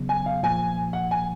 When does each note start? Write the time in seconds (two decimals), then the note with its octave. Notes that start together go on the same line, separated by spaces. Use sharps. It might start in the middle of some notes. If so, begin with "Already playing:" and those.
Already playing: C#3 F#3 B3
0.09 G#5
0.26 F5
0.43 A#2 F3 A#3 G#5
0.93 F#5
1.11 G#5